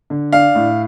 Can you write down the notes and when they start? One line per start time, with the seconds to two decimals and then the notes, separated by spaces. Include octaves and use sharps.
0.10 D3
0.32 D4 F5
0.55 A2